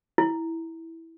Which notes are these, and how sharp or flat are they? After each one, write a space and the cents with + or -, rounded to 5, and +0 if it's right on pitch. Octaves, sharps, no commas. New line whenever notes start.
E4 -5